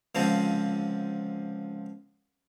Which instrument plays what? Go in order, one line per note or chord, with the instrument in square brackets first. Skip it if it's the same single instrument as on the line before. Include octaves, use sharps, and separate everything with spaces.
[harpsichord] C#2 D3 F3 C4